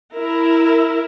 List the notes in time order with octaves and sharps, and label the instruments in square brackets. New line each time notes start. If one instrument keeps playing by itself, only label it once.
[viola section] E4 A#4